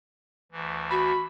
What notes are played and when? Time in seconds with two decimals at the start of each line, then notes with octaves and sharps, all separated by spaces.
0.52 D2 E3
0.91 F#4 B5